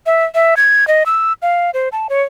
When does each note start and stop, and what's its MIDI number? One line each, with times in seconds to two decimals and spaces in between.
0.06 0.25 76
0.35 0.55 76
0.57 0.87 92
0.88 1.03 75
1.06 1.33 88
1.42 1.71 77
1.74 1.89 72
1.92 2.07 81
2.09 2.22 73